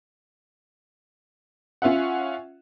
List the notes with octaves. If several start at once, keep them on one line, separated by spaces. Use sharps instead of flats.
C#4 F4 E5 F#5